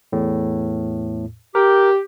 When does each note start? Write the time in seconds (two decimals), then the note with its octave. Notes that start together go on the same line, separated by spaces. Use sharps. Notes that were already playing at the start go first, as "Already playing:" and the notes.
0.12 E2 A2
1.55 G4 A#4